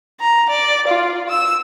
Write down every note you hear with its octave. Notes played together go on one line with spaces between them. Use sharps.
A#5
D5
F4
E6